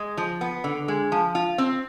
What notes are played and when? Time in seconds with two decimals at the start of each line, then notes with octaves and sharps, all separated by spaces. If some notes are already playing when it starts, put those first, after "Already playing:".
Already playing: G#3
0.17 F3
0.41 B3
0.64 D3
0.88 G#3
1.12 F3
1.35 F4
1.58 C4